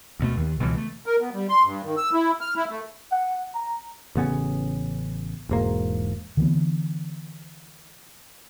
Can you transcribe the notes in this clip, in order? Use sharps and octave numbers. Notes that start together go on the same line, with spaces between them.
D2 B2 A3
D#2
C#2 B2 E3 F#3
A3
A#4
B3
G3
C6
G2
D#3
E6
E4
F6
E4
A3
F#5
A#5
A1 C#3 B3 C#4
E1 G#2 A#3
D3 E3 A3 B3